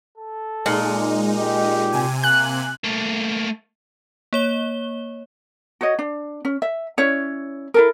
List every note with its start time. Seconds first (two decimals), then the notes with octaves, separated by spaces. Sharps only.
0.18 A4
0.66 A#2 G#3 D#4
1.38 G4
1.92 C3 G#5
2.24 A#3 F#6
2.84 A3 A#3
4.33 A#3 C#5 G7
5.81 F#4 C#5 D#5
5.99 D4
6.45 C#4
6.62 E5
6.97 C#4 E4 C#5 D5
7.74 E4 A4 A#4